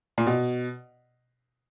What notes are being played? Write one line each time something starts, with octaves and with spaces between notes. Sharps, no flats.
A#2
B2